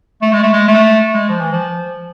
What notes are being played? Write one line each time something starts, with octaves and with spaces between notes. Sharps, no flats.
A3
G#3
A3
G#3
A3
G#3
F3
E3
F3